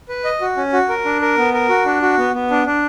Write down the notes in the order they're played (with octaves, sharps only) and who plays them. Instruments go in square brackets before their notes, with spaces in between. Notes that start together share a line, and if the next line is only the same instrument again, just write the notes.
[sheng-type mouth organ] B4
D#5
F#4
C#4
F#4
A#4
D4
A#4
B3
A#4
F#4
D4
F#4
B3
B3
D4
D4